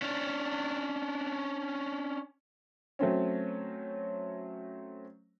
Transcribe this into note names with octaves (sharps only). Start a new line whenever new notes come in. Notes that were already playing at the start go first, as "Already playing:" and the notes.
C#4 D4
F#3 A3 C4 C#4